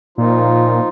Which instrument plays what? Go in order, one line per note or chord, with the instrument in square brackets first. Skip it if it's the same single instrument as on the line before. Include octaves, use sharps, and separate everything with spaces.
[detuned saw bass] A#2 [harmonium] F3 D#4 F4